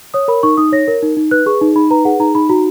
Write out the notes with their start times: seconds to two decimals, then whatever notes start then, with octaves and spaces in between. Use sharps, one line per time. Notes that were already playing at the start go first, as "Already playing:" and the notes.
0.14 C#5 D#6
0.28 A#4 B5
0.43 D#4 C#6
0.57 D#4 D#6
0.72 C#5 A#6
0.88 A#4
1.03 D#4
1.17 D#4
1.31 B4 F#6
1.46 G#4 C#6
1.61 D#4
1.76 D#4 B5
1.90 B4 A#5
2.05 G#4 F#5
2.20 D#4 A#5
2.35 D#4 B5
2.49 F#4 A#5